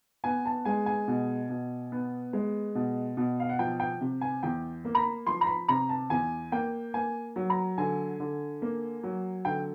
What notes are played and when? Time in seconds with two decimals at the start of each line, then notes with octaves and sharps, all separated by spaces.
0.24 B3 G#5
0.45 A5
0.65 G#3 G#5
0.86 G#5
1.08 B2
1.50 B2
1.92 B3
2.33 G#3
2.75 B2
3.17 B2
3.40 F5
3.49 F#5
3.59 F3 G5
3.80 G5
4.01 C3
4.21 G#5
4.43 E2 G5
4.85 A#3
4.95 A#5
4.99 B5
5.27 F3 C6
5.41 A#5
5.47 B5
5.68 C3 A#5
5.89 A5
6.10 E2 G#5
6.52 A#3 G5
6.94 A#3 G#5
7.36 F#3
7.50 A#5
7.78 D3 G#5
8.20 D3
8.62 A#3
9.03 F#3
9.45 D3 G5